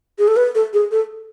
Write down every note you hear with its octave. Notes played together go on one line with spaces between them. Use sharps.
G#4
A4
B4
A4
G#4
A4